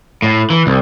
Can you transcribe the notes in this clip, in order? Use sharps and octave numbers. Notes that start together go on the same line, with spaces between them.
A2
E3
C2